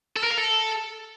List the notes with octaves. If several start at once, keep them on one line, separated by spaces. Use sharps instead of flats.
A4
A#4
F5
A4